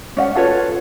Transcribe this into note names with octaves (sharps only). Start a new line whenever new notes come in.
C#4 D#5 F#5
F4 A4 B4 C#5